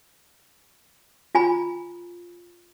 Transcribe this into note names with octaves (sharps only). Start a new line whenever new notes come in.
F4 G#5 A#5 B5